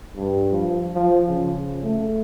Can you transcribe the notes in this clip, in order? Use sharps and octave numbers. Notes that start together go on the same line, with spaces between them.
G2
F3
F3
C#3
A3